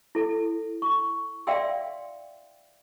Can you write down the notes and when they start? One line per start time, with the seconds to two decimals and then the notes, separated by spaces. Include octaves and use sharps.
0.15 E4 A4
0.82 C#6
1.47 D5 E5 F5 G5 C6 E6